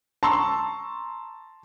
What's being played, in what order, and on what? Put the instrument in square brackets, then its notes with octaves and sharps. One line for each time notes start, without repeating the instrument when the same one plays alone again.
[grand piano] A5 A#5 C6 C#6 E6